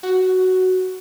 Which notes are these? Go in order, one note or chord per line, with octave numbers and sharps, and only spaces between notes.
F#4